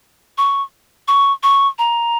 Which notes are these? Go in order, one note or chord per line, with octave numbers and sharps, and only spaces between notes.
C#6
C#6
C#6
A#5